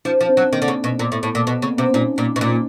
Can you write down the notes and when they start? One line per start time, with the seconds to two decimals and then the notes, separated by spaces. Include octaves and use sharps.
0.05 F3 C#4 D#4
0.21 F3
0.29 C4 D4
0.37 F#3
0.52 D#3 A#3 C4
0.62 D3
0.68 C#3
0.84 B2
0.92 A#3
0.99 A#2 B3
1.12 A2
1.23 A2
1.35 A#2
1.47 B2 B3
1.62 C#3 A#3 C4
1.78 C3 B3 C#4
1.94 A#2 C#4 D#4
2.18 A#2
2.36 B2
2.41 A#2